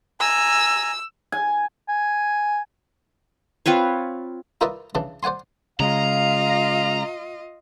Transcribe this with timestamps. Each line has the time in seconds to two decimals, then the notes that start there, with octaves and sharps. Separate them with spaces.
0.20 G#5 A#5 E6
1.32 G#5
1.89 G#5
3.66 C4 F4 B4 C#5
4.61 D#4 F4 A#4 B4 D5 E5
4.95 C#3 E3 D4
5.23 C5 D5 F#5 G#5 C6
5.80 C#3 G#3 F4 D#5 F5 A#5